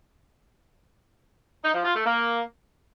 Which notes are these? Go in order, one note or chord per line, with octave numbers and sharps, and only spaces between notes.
D#4
F3
F4
A3
A#3